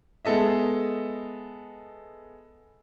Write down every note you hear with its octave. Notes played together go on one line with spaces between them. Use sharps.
G#3 B3 A4 D#5 E5